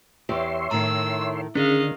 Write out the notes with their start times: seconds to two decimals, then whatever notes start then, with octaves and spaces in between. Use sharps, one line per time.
0.29 E2 G4 C#5 E5 C6
0.71 A2 D#3 A#5 E6
1.55 D3 D#3 C#4 G#4 D#5 F5